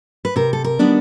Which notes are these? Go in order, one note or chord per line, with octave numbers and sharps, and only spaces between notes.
B4
C3 A#4
A4
A#4
D#3 G3 B3 D4